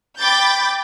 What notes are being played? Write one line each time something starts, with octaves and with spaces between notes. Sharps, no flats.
G5 B5 D6 G6 A6